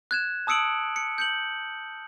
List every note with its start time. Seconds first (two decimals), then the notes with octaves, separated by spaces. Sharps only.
0.11 F#6 G#6 E7
0.47 A5 D#6 E6 C#7 D7 F#7
0.96 C#7
1.18 G6 C#7 F#7